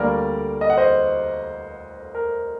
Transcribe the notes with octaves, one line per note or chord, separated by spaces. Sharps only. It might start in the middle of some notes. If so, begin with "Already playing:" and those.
Already playing: D2 D3 G3 A#3 A#4 D5
D#5
F#5
C5 D#5
A#4